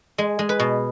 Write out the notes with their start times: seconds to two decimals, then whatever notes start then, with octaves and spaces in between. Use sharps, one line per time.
0.18 G#3
0.39 G#3
0.49 B4
0.60 B2